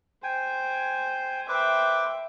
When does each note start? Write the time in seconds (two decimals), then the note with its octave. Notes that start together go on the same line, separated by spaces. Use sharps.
0.24 C5 G5 G#5
1.49 B4 C5 E5 G5 D6